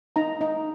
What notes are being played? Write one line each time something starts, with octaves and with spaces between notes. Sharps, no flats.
D#4 A#5
D#4